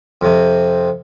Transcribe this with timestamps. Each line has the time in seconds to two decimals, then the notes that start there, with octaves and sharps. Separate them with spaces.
0.21 F2 C3